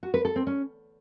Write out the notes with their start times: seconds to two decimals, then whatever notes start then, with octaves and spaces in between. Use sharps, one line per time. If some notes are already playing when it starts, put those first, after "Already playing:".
0.03 F#4
0.14 B4
0.25 A4
0.36 C4
0.47 C#4